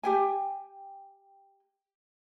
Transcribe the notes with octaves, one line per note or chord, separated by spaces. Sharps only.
G4 G5 G#5